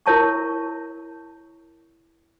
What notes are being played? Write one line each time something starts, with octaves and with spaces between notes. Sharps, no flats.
E4 A#4 C#5 A5 C#6